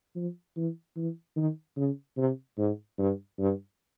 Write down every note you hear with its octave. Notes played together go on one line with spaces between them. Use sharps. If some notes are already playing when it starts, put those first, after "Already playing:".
F3
E3
E3
D#3
C#3
C3
G#2
G2
G2